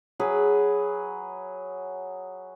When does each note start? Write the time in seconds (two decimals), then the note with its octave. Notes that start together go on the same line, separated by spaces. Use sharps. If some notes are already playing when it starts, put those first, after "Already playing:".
0.19 F#3 G#4 B4